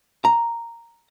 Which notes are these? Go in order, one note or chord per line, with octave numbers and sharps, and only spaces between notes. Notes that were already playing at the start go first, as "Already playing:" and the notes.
A#5